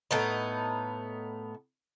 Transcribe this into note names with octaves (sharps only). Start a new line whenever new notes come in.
A2 B3 D#4